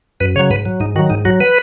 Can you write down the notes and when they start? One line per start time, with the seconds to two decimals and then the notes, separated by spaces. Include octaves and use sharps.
0.20 F#2 B4
0.36 C#3 C#5
0.39 F#3
0.50 G#2 B4
0.66 F#3
0.80 G#2 D#4
0.96 D#3 F#4
0.99 F#3
1.10 G#2 D#4
1.25 F#3 F#4
1.40 B4